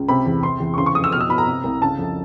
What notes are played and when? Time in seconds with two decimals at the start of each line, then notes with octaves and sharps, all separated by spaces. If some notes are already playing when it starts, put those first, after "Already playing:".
Already playing: C#2
0.09 C3 B5
0.26 E2
0.43 C3 C6
0.60 E2
0.74 C#6
0.77 C#3 C6
0.86 C#6
0.95 F2 D#6
1.04 E6
1.12 B2 F6
1.21 E6
1.29 B2 B5
1.38 A#5
1.47 C3
1.64 C2
1.82 C#3 A5
1.99 F2